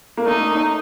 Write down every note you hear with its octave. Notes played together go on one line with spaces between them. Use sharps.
A#3
A3 D#4